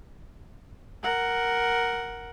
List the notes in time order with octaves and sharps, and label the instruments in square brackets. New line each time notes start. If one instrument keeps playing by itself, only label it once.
[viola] A#4 F#5